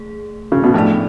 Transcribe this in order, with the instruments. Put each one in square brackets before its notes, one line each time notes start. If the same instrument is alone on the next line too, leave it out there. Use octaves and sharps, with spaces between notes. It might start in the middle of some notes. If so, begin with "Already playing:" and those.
Already playing: [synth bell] A3 G#4
[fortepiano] C#3
B2
[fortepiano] A2 [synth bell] F3 B3 D4 G#4 D5